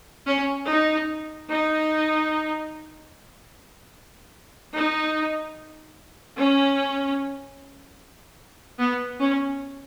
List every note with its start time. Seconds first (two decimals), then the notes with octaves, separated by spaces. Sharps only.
0.28 C#4
0.69 D#4
1.50 D#4
4.74 D#4
6.36 C#4
8.79 B3
9.19 C#4